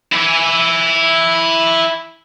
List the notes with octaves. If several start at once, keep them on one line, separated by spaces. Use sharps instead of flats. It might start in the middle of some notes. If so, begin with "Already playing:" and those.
E4 G#5